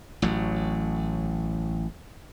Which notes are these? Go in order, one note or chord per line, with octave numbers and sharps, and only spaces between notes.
A1 A2 F#3